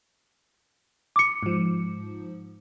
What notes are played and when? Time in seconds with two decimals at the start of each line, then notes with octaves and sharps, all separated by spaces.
1.16 D6 C#7
1.43 G#2 F3